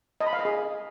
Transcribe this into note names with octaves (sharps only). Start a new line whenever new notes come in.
D#5
B5
F5
D#5
G#4